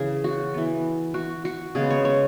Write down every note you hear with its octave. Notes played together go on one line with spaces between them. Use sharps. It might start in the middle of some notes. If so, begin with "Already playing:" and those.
Already playing: C#3 E3 G#4
F#4
E3 B3
F#4
F#4
C#3 G#3 B3 G#4
C#5
C#5